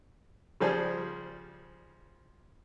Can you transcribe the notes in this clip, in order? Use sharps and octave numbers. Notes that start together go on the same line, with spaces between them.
C#3 F3 G3 G#4 C5